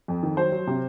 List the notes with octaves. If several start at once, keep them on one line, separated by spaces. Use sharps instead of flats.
F2
D#3
F#3 C5
F#3
C3